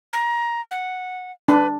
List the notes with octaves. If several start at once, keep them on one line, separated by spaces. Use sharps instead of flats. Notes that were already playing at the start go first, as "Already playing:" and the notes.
A#5
F#5
D4 B4